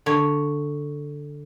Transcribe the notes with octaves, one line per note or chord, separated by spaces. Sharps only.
D3 C#5